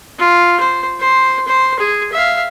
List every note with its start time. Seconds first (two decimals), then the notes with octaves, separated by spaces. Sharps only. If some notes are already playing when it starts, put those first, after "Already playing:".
0.19 F4
0.60 C5
1.00 C5
1.47 C5
1.79 G#4
2.13 E5 F5